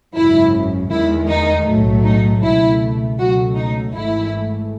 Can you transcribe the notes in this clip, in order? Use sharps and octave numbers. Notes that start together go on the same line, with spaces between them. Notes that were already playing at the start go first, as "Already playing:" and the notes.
G#1 F#2 C#3 E4
E2 D#3 G#3 E4
D#4
B1 A2 F#3 A3
D#4
C#2 B2 A3 E4
C#2 B2 F#3 A3 F#4
D#4
G#1 G#2 E3 A3 E4